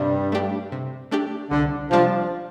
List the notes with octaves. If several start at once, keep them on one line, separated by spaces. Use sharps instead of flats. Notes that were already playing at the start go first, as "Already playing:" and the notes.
Already playing: G2 C3 G3
A3 D4 G4
C3
A3 D4 G4
C2 D3
C3 F3 G3 D4